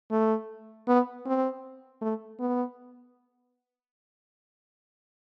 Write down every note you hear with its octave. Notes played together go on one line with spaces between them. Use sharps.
A3
B3
C4
A3
B3